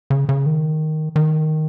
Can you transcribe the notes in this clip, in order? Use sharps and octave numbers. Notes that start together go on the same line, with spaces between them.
C#3
C#3
D#3
D#3